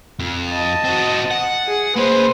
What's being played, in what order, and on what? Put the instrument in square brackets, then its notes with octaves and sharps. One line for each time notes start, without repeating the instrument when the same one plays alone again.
[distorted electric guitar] F2
[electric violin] D#5 A5
[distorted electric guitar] C4 F#4
F#5
[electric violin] G#4
[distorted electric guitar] A#3 G#4 [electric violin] B4 C5